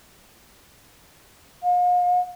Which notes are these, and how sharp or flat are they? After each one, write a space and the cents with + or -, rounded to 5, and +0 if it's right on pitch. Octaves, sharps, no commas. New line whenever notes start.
F5 +40